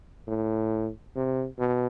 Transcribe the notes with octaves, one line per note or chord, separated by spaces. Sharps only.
A2
C3
B2